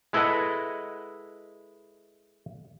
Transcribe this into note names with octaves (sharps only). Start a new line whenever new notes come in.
G#3 E4 A4 B4 D#5 F#5